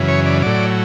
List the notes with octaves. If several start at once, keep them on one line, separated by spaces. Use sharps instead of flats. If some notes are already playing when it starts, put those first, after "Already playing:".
Already playing: F#2 C#3 E3
C#5
D5
A2 F#3 D5